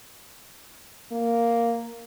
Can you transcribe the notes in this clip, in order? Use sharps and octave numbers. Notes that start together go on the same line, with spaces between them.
A#3